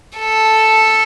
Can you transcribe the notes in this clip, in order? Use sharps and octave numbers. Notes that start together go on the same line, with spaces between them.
A4